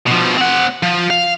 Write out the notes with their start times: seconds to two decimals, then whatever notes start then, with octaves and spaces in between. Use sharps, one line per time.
0.07 B2 F3
0.38 C4 F#5
0.83 F3
1.10 F5